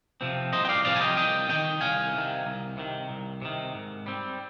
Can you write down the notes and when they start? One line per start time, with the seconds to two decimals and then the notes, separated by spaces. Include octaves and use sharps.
0.21 C3 F3 C4
0.53 C2 C5 D#5
0.65 G5
0.69 D5 F5
0.85 C3 F3 C4 D5 F5
0.96 G#5
1.01 D#5 G5
1.17 C2 D#5 G5
1.49 C3 D#3 D#5 G5
1.81 C2 F5 G#5
2.14 C3 D#3
2.45 C2
2.77 C3 D#3
3.09 C2
3.42 C3 D#3
3.74 G#2
4.06 G3 C4